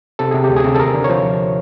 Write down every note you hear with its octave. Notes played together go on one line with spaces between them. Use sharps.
C3 A4
C3 G#4
G4
D2
G#4
C3
A4
D#2 A#4
D3
C#5
F3 C5